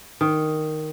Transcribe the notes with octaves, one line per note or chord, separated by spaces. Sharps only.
D#3